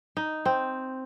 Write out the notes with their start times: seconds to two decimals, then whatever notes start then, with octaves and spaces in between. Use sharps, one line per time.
0.17 D#4
0.45 C4